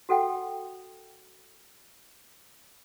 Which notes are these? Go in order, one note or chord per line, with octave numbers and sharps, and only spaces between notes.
F#4 A4 F#5 G5